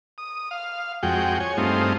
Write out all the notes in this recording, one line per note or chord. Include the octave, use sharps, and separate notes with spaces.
D#6
F5
F2 G#3 F#4 G5
C#5 G#5
G2 G#3 A3 C4 D#4 F4